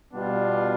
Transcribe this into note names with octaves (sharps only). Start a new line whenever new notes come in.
B2 G3 B3 D4 F4